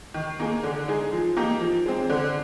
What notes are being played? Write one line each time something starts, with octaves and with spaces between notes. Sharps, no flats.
D#3
A#3 D#4 G#4
D3
G#3 D#4 G#4
F3
A#3 D#4 G4
F3
G#3 C4
D3